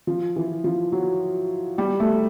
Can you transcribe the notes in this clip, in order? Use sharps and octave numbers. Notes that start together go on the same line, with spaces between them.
F3
E3
F3
F#3
G3
A3